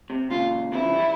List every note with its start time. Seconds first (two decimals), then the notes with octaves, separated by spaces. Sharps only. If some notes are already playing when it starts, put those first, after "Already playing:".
0.10 C3
0.31 A#2 C#3 F4
0.72 C3 E3 E4
0.83 C#3 F3
0.94 E3 G3